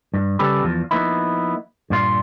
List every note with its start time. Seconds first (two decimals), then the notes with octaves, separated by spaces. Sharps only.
0.14 G2
0.39 C#3 G3 C#4 G4 A4 B4
0.63 E2 F3
0.91 F3 A#3 B3 D#4 E4
1.90 G2 A#2 F4